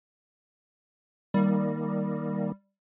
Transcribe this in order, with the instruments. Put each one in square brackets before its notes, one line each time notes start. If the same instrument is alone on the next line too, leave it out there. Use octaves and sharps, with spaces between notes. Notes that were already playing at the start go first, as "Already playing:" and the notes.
[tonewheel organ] D#3 A#3 [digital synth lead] G3